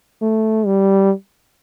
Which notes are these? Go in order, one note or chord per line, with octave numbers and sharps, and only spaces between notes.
A3
G3